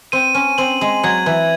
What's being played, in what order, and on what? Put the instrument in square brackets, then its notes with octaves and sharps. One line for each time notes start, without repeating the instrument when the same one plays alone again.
[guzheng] C4 [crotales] D#7
[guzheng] C#4
[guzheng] C4 [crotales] F#7
[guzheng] G#3
[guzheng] F#3 [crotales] G#6
[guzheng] E3